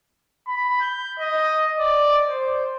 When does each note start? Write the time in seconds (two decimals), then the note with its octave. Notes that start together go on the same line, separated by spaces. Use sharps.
0.47 B5
0.81 G6
1.19 D#5
1.79 D5
2.28 C5